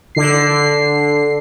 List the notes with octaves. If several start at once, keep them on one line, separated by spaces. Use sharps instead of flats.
D3 C7